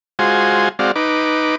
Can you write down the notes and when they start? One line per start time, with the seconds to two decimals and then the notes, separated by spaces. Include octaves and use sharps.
0.19 G#3 F4 F#4 C5 G#5
0.79 G#3 C4 F#4 D5 F5
0.96 D#4 B4 D6